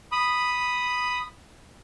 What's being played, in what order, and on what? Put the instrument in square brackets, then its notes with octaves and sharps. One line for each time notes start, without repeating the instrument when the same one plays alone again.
[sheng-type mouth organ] B5 D#6